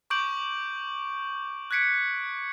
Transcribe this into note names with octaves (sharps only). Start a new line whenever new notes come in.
C#6 D6 G6 D7 F#7
F#6 G#6 B6 C#7 D7